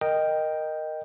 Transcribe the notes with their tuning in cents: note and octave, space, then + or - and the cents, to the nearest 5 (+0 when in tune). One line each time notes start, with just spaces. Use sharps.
A#4 +0 D#5 -5 G5 +0